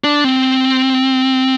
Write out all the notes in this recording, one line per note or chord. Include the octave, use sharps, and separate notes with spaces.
D4
C4